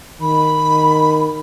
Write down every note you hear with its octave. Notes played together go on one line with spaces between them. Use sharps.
D#3 B5